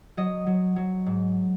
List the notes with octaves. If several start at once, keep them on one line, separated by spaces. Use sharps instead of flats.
F#3 D#5
F#3
F#3
G#2